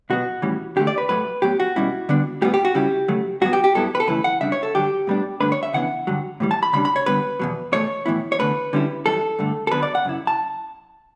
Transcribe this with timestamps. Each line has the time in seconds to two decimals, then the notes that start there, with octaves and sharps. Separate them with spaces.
0.10 B2 F#3 B3 F#4
0.42 A2 E3 G3 C#4
0.76 E2 D3 A3 G4
0.87 D5
0.98 B4
1.09 A2 F#3 A3 B4
1.42 A2 F#3 B3 G4
1.60 F#4
1.76 B2 G3 C#4 E4
2.09 D3 G3 B3 D4
2.42 A2 G3 B3 G4
2.54 G4
2.65 F#4
2.75 C#3 G3 C#4 E4 G4
3.08 C#3 F#3 A3
3.41 G2 F#3 B3 F#4
3.53 G4
3.64 G4
3.75 G2 F#3 B3 E4 A4
3.95 B4
4.00 A4
4.07 F#2 C#3 E3 A3 E4 B4
4.24 F#5
4.41 C#3 G3 D4 E5
4.52 C#5
4.63 A4
4.75 G2 D3 F#3 G4
5.07 A2 G3 B3 D4
5.41 G2 D3 A3 D4 B4
5.52 C#5
5.63 E5
5.73 C#3 E3 B3 D4 F#5
6.07 G2 D3 F#3
6.40 A2 E3 G3
6.51 A5
6.63 B5
6.73 C#3 E3 G3 D4 B5
6.85 B5
6.96 C#5
7.06 G2 D3 G3 B3 B4
7.39 E2 B2 F#3
7.72 E2 B2 A3 C#5
8.06 A2 E3 B3 E4
8.32 C#5
8.39 E2 D3 A3 B4
8.73 D3 G3 C#4 E4
9.06 F#2 E3 G3 A4
9.39 G2 D3 A3
9.67 A4
9.72 D3 F#3 B3 D4 B4
9.83 D5
9.95 F#5
10.05 F#2 C#3 E4
10.27 A5